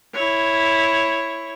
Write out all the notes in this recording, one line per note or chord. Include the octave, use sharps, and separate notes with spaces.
E4 C#5